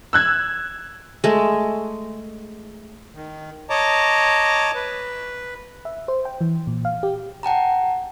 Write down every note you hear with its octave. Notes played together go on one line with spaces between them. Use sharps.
E6 F#6 G#6
G#3 A3
D#3
C#5 D#5 A5 A#5 D6
B4
E5
C5
G5
E3
A#2
F5
G4
F#5 G5 A5 A#5